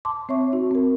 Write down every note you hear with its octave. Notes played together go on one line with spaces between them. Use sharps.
A5 C6 D6
C4 C#5 E5 C#6
D#4 F#4
C4 A#4